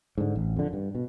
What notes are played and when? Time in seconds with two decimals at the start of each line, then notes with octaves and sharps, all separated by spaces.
0.18 G#2 D3
0.36 A1
0.56 F2 D3
0.73 G2
0.95 B2